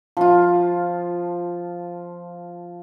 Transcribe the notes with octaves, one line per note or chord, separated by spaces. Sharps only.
F3 F4